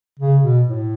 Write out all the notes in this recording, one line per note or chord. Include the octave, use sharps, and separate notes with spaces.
C#3
B2
A2